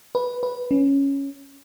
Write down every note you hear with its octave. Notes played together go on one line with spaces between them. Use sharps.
B4
B4
C#4